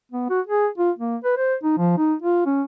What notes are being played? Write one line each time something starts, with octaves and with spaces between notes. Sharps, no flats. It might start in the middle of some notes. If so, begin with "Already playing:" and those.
B3
F#4
G#4
F4
A#3
B4
C5
D#4
F3
D#4
F4
C#4